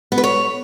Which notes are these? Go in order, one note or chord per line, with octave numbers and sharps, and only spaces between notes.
B3
B4
C#5